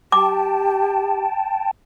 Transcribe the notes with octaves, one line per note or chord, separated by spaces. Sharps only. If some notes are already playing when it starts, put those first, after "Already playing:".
G4 G5 A5 D6